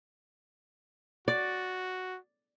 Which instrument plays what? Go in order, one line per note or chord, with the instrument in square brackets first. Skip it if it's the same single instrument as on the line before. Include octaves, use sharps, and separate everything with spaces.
[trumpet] F#4 [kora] D5